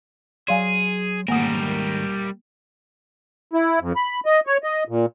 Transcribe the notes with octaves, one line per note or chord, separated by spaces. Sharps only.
F#3 G#4 D5 F5 G#5 C6
G#2 D#3 G3 A3 A#3 A#4 F#5 D#6
E4
F2
B5
D#5
C#5
D#5
A#2